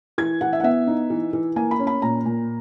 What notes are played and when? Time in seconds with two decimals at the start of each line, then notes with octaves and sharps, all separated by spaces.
0.18 E3 G#6
0.41 E3 F#5
0.53 E5
0.60 F#5
0.64 B3 E5
0.87 D#4
1.10 E3
1.33 E3
1.56 A#3 G#5
1.71 B5
1.79 C#4
1.87 B5
2.02 A#2 A#5
2.26 A#2